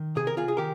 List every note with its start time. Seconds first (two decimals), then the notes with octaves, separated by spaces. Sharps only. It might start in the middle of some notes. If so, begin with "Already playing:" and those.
Already playing: D#3
0.16 C3 G#4
0.27 A#4
0.37 F4 G#4
0.48 G#4
0.57 D#3 G4 A#4